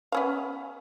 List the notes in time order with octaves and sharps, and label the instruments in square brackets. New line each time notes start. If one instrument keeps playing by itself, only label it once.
[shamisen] B3 C#4 F5